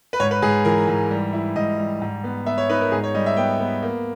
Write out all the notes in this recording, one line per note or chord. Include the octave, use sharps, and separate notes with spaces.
B4
G#2 C#5
B4
G#2 G#4
E3 A#4
G#2
G3
E4
G#2 D#5
G3
G#2
B3
B3 E5
C#5
D#4 B4
A#4
G#2 G#4
C#5
G3 D#5
E5
B3 G5
B3
A#3